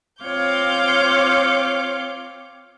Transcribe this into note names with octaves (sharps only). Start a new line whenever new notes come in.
C4 F4 C#5 F5 D6 G6